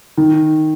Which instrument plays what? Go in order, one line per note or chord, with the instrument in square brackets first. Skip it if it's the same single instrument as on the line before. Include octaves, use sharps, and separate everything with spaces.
[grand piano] D#3